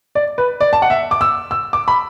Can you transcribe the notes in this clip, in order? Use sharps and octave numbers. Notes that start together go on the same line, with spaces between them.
D5
B4
D5
A5
F#5
E5
D6
E6
E6
D6
B5